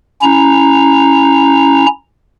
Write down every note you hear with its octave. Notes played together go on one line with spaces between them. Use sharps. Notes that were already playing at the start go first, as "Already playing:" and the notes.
C#4 E4 A#5